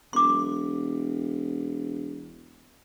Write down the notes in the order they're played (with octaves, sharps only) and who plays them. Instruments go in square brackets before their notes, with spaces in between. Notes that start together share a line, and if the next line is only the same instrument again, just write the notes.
[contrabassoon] E1 [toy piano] C6 D6